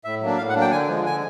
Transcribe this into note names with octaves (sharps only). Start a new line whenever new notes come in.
A2 E5
F#3 A#3 D4
A2 F5
F#5
F#3 A#3 D4
G5
D3 G#5
F3 G#3
D3 G#5